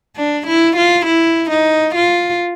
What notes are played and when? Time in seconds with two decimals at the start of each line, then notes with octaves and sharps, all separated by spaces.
0.16 D4
0.47 E4
0.77 F4
1.06 E4
1.51 D#4
1.95 F4